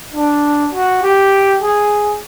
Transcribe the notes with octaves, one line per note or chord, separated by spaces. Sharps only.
D4
F#4
G4
G#4